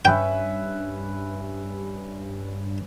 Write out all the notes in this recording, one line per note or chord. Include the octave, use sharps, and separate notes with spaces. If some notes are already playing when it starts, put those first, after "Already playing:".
G2 C#4 B4 E5 G5